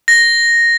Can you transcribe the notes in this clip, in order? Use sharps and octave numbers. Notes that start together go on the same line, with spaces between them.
A#6